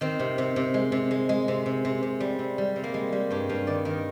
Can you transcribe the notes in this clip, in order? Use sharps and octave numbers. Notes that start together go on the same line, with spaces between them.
D#3 C4
C3
C3
C3
G#3
C3
G#3
G#3
C3
C3
C3
C3
G3
C3
G3
C3
A#3
G3 G#3
G3 G#3
G2 G4
G2 F5
D#3 D5
D#3 A#4